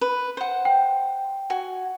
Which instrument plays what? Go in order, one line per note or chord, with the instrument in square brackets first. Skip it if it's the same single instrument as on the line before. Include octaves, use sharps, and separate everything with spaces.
[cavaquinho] B4
C5 F#5
[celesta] G5
[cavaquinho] F#4 G#5